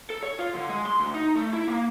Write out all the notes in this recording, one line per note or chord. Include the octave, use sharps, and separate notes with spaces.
A4
C#5
F4
D3
G#3
C6
D2
D#4
A3
E4
A#3